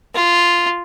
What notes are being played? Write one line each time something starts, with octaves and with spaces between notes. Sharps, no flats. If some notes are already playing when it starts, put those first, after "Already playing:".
F4